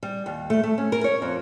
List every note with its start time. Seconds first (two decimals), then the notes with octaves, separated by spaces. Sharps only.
0.03 G3
0.26 D#2
0.50 A3
0.63 A3
0.78 C#4
0.92 A#4
1.04 C#5
1.22 F2